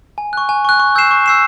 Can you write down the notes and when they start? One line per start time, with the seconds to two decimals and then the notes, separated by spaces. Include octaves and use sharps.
0.18 G#5
0.33 C#6 F#6
0.49 G#5
0.65 C#6 F#6
0.80 C#6
0.95 E6 G6 C7 E7
1.11 C#6
1.26 E6 G6 C7 E7